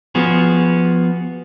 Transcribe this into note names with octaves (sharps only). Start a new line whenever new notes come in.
F3 B3 F#4 G#4